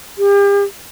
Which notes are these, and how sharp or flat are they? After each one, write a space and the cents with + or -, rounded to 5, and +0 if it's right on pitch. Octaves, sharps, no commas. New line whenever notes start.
G4 +40